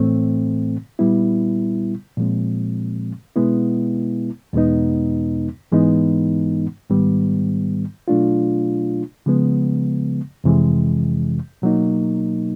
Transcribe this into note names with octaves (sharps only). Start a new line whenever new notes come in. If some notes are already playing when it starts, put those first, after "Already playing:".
Already playing: A2 E3 A3 C4
A#2 G3 B3 E4
A#2 F3 G#3 C4
B2 G#3 B3 E4
E2 B2 G#3 B3 D#4
G#2 E3 G#3 B3 D#4
G#2 D#3 G3 B3
B2 F#3 A3 D4 F4
C#3 F3 G#3 B3
F2 C3 E3 G#3
B2 F#3 A#3 D#4